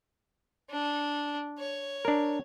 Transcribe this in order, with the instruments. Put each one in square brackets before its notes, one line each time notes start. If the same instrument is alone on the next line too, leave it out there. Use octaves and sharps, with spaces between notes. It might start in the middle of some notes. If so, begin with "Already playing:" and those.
[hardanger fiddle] D4
C#5
[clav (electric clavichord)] D4 A#4